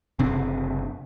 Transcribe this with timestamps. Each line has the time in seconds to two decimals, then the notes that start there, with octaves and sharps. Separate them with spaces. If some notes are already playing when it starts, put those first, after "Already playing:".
0.19 F#1 C3 C4 D4